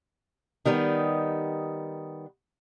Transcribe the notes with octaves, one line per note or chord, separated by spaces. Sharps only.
D#3 G3 B3 D#4